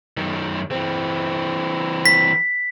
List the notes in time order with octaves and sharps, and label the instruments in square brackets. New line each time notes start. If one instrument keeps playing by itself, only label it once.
[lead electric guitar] F#2 D#3
E3 C4
[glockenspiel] B6